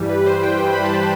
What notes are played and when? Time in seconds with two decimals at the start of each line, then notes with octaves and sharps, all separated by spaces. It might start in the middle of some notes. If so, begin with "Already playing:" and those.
Already playing: G2 E3 G3
0.09 B4
0.26 C5
0.43 G5
0.60 G2 E3 G3 G5
0.73 B5
0.84 A5